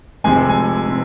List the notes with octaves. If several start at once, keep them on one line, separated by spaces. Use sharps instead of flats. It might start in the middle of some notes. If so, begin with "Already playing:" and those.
F1 F2 C3 G#3 G#5
G#5
C3